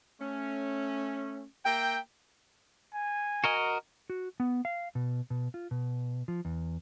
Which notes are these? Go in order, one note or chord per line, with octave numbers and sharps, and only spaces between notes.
A3 C#4
A#3 E5 G5
G#5
F#4 A#4 D#5
F#4
B3
F5
B2
B2
F4
B2
F3
E2